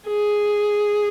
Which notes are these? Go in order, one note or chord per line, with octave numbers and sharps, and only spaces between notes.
G#4